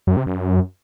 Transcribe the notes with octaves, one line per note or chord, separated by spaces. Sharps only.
F#2
C3
F#2